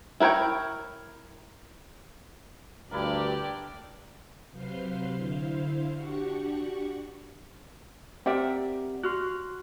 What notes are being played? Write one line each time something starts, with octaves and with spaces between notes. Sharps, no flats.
E4 A#4 B4 C#5 G5
D2 G2 D4 E4 G4 A#4 D5
C3 F#3 B4 C5 F5 C6
D3 E4 C5 F5
D4 F#4 G4 F#5 C#6
C4 G4 A#4 D5 E5 F#5
F#4 C6 F6 F#6